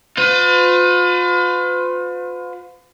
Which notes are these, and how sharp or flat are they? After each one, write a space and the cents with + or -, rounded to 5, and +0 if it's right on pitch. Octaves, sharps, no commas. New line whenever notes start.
F4 +35 B4 +45